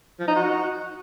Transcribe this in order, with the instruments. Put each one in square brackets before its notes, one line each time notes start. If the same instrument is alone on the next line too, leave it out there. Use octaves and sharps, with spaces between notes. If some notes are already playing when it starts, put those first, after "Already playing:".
[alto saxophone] F3
D#4
F#4